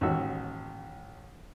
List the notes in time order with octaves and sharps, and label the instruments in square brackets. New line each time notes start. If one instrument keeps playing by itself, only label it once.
[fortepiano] A1 D#2 G#2 F#4 E6